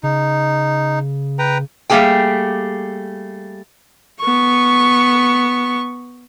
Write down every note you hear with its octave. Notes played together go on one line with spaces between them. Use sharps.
C#3 D#4
B4 G5 A#5
G3 A3 A#3 G4 G#4 G5
B3 C#6